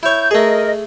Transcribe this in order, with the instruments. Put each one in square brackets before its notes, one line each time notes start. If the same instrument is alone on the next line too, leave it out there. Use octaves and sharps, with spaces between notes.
[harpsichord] E4 C#5 [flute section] G6
[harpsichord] A3 G#4 [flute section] A#4 D#5